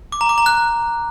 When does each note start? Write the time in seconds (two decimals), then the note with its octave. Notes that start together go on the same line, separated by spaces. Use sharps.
0.12 D6
0.21 A#5
0.29 D6
0.38 A#5
0.46 F#6